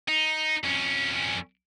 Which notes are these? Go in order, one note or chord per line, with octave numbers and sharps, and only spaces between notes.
D#4
F2 C#4